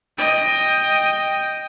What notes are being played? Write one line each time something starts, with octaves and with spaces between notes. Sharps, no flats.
D#5 G5